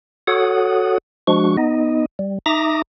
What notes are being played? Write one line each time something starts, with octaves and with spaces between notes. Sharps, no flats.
F#4 A4 C#5 F#5 D#6
F3 G#3 D4 F#4 C#6
B3 D#4 D#5
G3
D#4 E5 A#5 D6 D#6 A#6